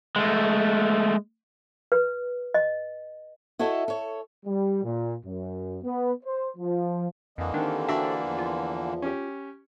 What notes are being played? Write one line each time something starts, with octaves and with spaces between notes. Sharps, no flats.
G#3 A3
B4
D#5
E4 F#4 A4 C#5 D#5 E5
A4 C#5
G3
A#2
F#2
B3
C5
F3
F2 D3 E3 A#3 D#5
D#3 C4 D4 G4 A4
D4 F#4 D5 E5
E2 F3
F4
C#4 G4